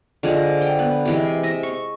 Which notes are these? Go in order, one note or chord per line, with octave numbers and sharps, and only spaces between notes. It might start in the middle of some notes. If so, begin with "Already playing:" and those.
D3 F3 G#3 G#4
G5
B3
C3 E3 G#3
D#5 E5
C#6